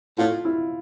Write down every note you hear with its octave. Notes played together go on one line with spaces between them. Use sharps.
A2 F4
E4